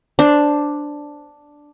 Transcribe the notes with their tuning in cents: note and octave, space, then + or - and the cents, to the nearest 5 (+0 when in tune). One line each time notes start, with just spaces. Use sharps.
D4 +0 C5 +0